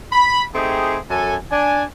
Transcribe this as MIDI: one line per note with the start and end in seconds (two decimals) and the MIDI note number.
0.12 0.43 83
0.55 0.98 57
0.55 0.98 60
0.55 0.98 63
0.55 0.98 67
0.55 0.98 68
1.10 1.35 42
1.10 1.35 69
1.10 1.35 80
1.51 1.84 62
1.51 1.84 80